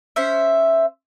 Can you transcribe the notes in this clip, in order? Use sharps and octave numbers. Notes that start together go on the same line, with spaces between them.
C#4 C5 E5